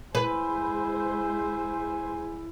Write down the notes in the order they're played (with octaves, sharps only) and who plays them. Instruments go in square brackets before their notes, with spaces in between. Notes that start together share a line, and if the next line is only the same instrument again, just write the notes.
[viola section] G#3 C5 [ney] E4 [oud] B4 [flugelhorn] G#5